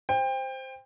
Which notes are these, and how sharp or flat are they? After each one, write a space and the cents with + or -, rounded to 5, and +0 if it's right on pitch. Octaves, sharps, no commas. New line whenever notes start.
C5 +0 G5 +25